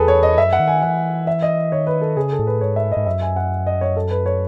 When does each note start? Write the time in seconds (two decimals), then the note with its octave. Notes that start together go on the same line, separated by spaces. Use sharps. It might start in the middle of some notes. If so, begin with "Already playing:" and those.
Already playing: E2 G#4 A4 B4
0.08 C#5
0.23 D#5
0.38 F#2 E5
0.53 F#5
0.60 D#3
0.68 G#5
0.82 E3 F#5
1.27 E5
1.42 D#5
1.72 D#3 C#5
1.87 B4
2.01 A4
2.17 C#3 G#4
2.32 A4
2.39 A2
2.47 B4
2.61 G#2 C#5
2.76 E5
2.92 D#5
2.97 G#2
3.06 F#2 E5
3.21 G#5
3.36 F#5
3.67 D#5
3.81 C#5
3.96 A4
4.11 B4
4.26 C#5